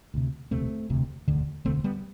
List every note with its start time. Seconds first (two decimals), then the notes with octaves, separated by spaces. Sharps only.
0.14 D2 C3
0.51 E1 D2 C3 A3 C4
0.90 E1 D2 C3
1.28 E1 D2 D3
1.65 E1 D2 D3 A3 C4
1.84 G3 B3